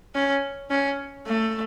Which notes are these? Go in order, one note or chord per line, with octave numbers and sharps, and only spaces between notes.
C#4
C#4
A3